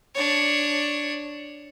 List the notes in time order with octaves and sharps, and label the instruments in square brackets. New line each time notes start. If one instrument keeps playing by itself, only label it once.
[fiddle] D4 C#5